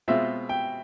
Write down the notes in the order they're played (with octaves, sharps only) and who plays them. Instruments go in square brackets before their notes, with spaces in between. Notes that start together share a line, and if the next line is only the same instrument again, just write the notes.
[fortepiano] B2 G#3 C4 F4 [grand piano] E5
[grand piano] G5